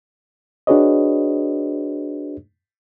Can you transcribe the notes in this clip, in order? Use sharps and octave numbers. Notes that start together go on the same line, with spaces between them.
D4 F#4 G#4 B4 C#5 D#5